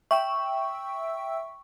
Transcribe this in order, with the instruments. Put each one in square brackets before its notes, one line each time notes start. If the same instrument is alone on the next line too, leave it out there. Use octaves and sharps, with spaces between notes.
[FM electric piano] E5 G5 E6 [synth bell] C#6